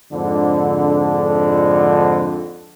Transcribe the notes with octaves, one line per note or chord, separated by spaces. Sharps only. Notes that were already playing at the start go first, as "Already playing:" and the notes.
F2 G#2 D3